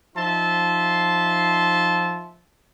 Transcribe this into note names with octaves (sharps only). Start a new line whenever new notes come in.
F3 D#4 E5 A5 C6